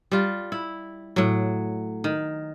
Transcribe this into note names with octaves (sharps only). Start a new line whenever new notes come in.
G3 F4
E4
A2 F#3
D#3